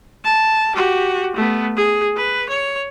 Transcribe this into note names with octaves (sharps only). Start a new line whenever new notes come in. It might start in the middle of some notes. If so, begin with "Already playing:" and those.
A5
F#4 G4
A3 B3
G#4
B4
C#5